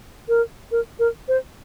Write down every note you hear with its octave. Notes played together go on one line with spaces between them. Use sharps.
A#4
A#4
A#4
C5